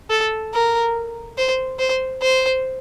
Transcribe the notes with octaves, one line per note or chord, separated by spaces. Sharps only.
A4
A#4
C5
C5
C5